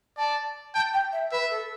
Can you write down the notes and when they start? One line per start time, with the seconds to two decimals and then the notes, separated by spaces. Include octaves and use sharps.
0.18 D5 A5
0.74 G5 A5
0.94 G5
1.12 E5
1.32 B4 E5
1.51 A4